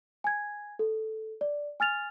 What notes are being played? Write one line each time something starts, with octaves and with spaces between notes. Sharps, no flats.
G#5 G#6
A4
D5
G#5 F6 A6 F7